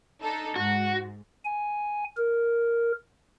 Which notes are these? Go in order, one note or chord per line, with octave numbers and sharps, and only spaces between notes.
D4 D#4 A4
G#2 F#4
G#5
A#4